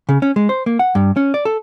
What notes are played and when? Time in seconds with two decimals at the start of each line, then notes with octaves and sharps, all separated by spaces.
0.09 C#3
0.22 C#4
0.36 G#3
0.49 C5
0.66 A#3
0.79 F#5
0.95 G2
1.16 C#4
1.34 D5
1.45 A4